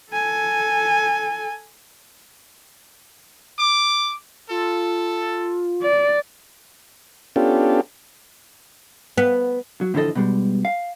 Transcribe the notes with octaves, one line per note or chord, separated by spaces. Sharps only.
A4 G#5
D6
F4 A4
D5
B3 C#4 D4 F4 G4 A4
B3
F#3
A2 D3 E3 F3 A4 D#5
B2 G3 G#3
F5